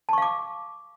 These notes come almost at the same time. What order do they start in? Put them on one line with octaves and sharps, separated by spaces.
A5 C#6 F5 D6